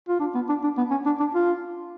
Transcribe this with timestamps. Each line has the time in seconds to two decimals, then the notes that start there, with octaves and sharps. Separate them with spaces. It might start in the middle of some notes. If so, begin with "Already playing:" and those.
0.08 F4
0.20 D4
0.35 B3
0.49 D4
0.63 D4
0.78 B3
0.91 C#4
1.06 D4
1.20 D4
1.35 F4